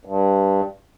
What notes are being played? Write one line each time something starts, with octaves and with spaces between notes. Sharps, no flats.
G2